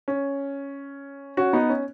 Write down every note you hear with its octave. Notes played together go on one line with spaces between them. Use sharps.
C#4
C#4 F#4
B3 D#4
C#4